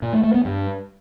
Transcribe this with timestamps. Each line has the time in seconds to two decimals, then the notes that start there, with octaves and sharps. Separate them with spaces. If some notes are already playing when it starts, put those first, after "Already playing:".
0.02 A#2
0.13 A3
0.24 A3
0.34 B3
0.45 G2